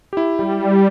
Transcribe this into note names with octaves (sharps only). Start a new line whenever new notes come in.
E4 G4
G3